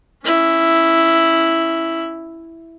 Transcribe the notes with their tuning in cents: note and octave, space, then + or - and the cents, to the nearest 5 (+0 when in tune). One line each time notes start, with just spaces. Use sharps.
C#4 +0 E4 +0